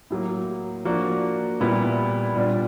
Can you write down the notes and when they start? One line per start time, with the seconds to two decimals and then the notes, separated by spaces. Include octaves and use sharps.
0.10 A2 F#3 A#3
0.85 F3 A#3 D4 F#4
1.60 A#2 G3 B3 E4
2.35 A#2 G3 B3 D4 F4